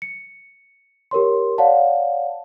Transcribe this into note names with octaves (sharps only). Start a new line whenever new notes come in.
C#7
G4 A#4 C#5 C6
C#5 D5 F5 F#5 A5